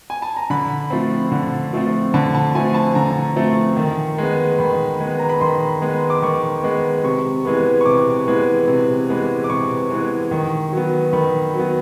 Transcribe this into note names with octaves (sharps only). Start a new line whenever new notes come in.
G#5
A5
A#5
D3 B5
F3 A3 C4
D3
F3 A3 C4
D3 A5
A5
F3 A3 C4 G#5
A5
D3 A#5
F3 A3 C4
D#3
G#3 B3
D#3 B5
G#3 B3
A#5
B5
D#3 C6
G#3 B3
D6
D#3 C#6
G#3 B3
C3 C#6
E3 G#3 B3
C#6
C3 D6
E3 G#3 B3
C3
E3 G#3 B3
D6
C3 C#6
E3 G#3 B3
D#3
F#3 B3
D#3 B5
F#3 B3